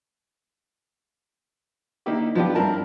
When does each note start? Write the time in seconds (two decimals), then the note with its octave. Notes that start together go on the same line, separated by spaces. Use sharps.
2.06 D3 A#3 D#4 E4 G4
2.35 F3 B3 D4 F4 G4
2.55 G2 C4 E4 A#4 A5